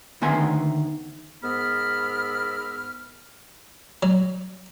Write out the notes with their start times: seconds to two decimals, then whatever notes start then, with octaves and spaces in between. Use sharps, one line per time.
0.22 D2 D#3 B3 E5 G#5 C6
1.44 G#2 B3 A#4 B5 E6 F6
4.03 F#3